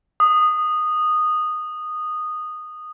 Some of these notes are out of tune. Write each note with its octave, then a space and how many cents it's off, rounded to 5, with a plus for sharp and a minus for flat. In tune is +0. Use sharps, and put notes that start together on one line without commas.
D#6 -10